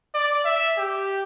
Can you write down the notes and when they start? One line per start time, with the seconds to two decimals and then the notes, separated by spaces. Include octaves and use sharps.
0.15 D5
0.45 E5
0.78 G4